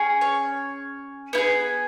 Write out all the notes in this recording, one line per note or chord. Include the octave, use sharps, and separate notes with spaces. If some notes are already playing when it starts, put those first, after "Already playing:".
Already playing: C#4 G#4
C#5
B3 E4 G#4